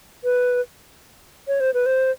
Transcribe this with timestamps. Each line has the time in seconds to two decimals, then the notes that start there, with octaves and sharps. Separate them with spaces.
0.24 B4
1.48 C#5
1.60 C5
1.74 B4
1.86 C5